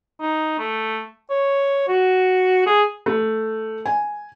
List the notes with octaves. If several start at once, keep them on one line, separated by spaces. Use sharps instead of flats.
D#4
A3
C#5
F#4
G#4
A3
G#5